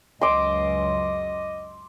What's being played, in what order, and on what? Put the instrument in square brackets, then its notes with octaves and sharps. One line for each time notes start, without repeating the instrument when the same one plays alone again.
[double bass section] C#2 F#2 [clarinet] D#5 [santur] C6 D6 E6